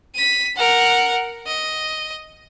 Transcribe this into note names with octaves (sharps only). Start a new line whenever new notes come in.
B6 D#7
A#4 F#5
D#5